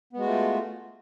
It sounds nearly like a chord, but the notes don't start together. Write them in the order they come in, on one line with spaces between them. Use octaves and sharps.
B3 G#3 F#4 A3 F4